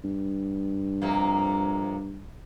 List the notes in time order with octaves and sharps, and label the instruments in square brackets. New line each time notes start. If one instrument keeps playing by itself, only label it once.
[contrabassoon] G2
[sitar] F2 C3 A#3